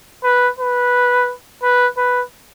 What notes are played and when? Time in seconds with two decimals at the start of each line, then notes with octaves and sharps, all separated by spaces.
0.24 B4
0.59 B4
1.63 B4
1.97 B4